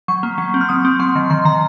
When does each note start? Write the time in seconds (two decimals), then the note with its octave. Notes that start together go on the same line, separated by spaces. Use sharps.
0.08 F#3 C#6
0.23 A#3
0.38 F#3
0.54 C4
0.61 F6
0.69 F#3 D#6
0.85 C4
1.00 F#3 C6
1.15 D#3
1.30 D#3 C6
1.45 D#3 A#5